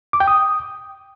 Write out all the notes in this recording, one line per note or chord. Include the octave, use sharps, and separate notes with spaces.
D6
G5
D#6